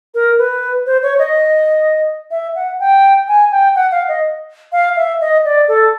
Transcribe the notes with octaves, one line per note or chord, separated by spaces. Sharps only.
A#4
B4
C5
C#5
D#5
E5
F#5
G5
G#5
G5
F#5
F5
D#5
F5
E5
D#5
D5
A4